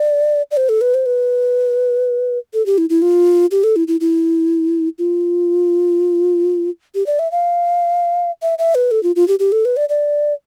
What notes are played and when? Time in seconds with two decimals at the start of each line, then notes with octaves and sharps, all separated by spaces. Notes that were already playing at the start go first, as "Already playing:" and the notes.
Already playing: D5
0.51 D5
0.57 C5
0.69 A4
0.81 B4
0.94 C5
1.06 B4
2.54 A4
2.66 G4
2.78 E4
2.90 E4
3.02 F4
3.51 G4
3.64 A4
3.76 E4
3.88 E4
4.01 E4
4.98 F4
6.95 G4
7.06 D5
7.19 E5
7.32 F5
8.42 E5
8.59 E5
8.75 B4
8.91 A4
9.03 F4
9.16 F4
9.28 G4
9.39 G4
9.52 A4
9.65 B4
9.77 D5
9.89 D5